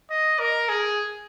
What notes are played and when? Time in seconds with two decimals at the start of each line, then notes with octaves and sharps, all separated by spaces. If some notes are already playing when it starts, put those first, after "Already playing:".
0.10 D#5
0.39 A#4
0.69 G#4